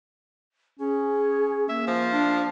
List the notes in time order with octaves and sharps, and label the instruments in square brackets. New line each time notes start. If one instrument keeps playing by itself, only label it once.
[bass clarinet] C#4 [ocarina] G#4
[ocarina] A#3 [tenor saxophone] E5
[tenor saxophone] F3
[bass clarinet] D4